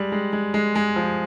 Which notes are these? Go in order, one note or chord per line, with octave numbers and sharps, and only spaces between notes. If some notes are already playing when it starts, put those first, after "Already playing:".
Already playing: G3 G#3
G#3
G#3
G#3
G#3
F3